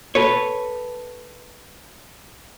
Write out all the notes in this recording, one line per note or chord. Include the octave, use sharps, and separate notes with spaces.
A4 B4 C#5